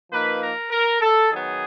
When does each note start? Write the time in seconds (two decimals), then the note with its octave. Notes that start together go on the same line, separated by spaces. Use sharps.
0.12 F3 A#3 D#4 B4
0.42 A#4
0.71 A#4
1.01 A4
1.30 D#3 F#3 B3 G#4